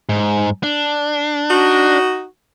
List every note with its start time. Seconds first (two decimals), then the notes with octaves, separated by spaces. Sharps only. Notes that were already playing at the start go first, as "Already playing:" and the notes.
0.09 G#2
0.63 D4
1.50 D#4 F#4